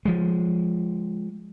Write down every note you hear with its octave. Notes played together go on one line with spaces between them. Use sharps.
F3 G#3